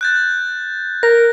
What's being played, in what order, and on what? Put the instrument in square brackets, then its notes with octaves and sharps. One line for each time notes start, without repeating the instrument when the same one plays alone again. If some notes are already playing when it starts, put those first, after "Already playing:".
[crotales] F#6 G6 A6
[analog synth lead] A#4 [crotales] A#6